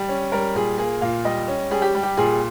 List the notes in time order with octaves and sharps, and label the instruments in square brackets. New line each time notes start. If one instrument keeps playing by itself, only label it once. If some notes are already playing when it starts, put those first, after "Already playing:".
Already playing: [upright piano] G3
C#4
G3 A#4
A#2 G#4
A#3 G#4
A#2 F5
G3 D#5
C#4
G3 G#4
G4
G3
G4
A#2 G#4